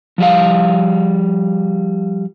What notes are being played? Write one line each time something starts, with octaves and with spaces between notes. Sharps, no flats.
F3 G3 F5